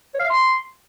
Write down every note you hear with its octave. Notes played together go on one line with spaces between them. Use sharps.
C#5
F5
E5
C6